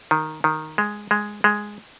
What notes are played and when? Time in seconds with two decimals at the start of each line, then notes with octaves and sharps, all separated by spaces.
0.11 D#3
0.44 D#3
0.78 G#3
1.11 G#3
1.44 G#3